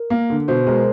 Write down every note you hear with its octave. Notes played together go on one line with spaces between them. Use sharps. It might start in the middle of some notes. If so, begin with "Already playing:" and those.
Already playing: A#4
A#3
D3
B2 C5
G#3 A#4